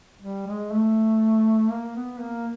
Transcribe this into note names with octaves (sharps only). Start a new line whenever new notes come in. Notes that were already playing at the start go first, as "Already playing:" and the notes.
G3
G#3
A3
A#3
B3
A#3